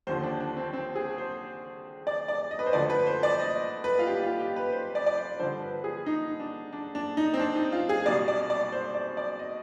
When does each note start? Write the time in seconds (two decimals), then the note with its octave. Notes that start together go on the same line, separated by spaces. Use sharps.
0.07 D#2 D3 F3 C5
0.23 D4
0.40 D4
0.57 C4
0.73 C4
0.96 G#4
1.18 C5
2.07 D5
2.28 D5
2.51 D#5
2.59 B4
2.66 C5
2.73 D2 D3 F3 D5
2.90 B4
3.07 C5
3.23 D5
3.40 D#5
3.84 B4
3.99 F4
4.07 G4
4.23 F4
4.39 G4
4.56 B4
4.72 C5
4.95 D5
5.06 D5
5.17 C5
5.39 G2 D3 F3 C5
5.62 B4
5.84 G#4
6.06 D#4
6.40 D4
6.73 D4
6.95 D4
7.17 D#4
7.34 C4
7.39 D4
7.56 D#4
7.72 F4
7.89 G#4
8.06 C2 B2 G3 D5
8.28 D5
8.50 D5
8.72 C5
8.95 D5
9.17 D5
9.39 D#5